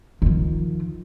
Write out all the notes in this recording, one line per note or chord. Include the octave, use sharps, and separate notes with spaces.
D#3 F3